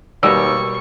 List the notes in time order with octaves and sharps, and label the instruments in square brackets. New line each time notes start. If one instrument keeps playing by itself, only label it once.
[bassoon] D#2 [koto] B2 G3 [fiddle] C#6 [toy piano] E6